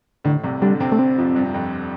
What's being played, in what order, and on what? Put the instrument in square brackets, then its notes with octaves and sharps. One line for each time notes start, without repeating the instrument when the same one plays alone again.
[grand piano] A1 A2 [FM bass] D3
[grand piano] C2 C3
[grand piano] D3 D4 [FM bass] G3
[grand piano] C3 C4
[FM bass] A3
C4
[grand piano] F2 F3
G2
F2